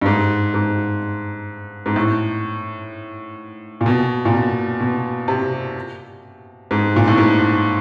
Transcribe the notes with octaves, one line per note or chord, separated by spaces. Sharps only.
G2
G#2
G#2
G#2
A2
A#2
B2
A#2
B2
B2
C3
G#2
A#2
A2
G#2